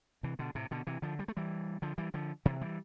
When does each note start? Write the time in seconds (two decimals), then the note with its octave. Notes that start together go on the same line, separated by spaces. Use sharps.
0.23 C3 E3
0.39 B2 D3
0.55 A2 C3
0.71 B2 D3
0.87 C3 E3
1.02 D3 F3
1.19 G3
1.28 A3
1.37 E3 G3
1.82 D3 F3
1.98 E3 G3
2.14 D3 F3
2.45 C3 E3
2.61 E3 G3